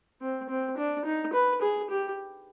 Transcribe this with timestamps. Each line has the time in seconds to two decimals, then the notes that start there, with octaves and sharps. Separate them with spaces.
0.22 C4
0.49 C4
0.78 D4
1.05 D#4
1.33 B4
1.62 G#4
1.90 G4